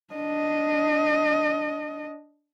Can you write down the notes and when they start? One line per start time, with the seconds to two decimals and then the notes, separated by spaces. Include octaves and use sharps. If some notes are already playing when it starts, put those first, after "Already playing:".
0.14 D4 D#5